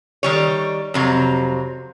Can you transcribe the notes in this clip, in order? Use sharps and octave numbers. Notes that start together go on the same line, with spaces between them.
D#3 G3 C#5
F2 C3 F#3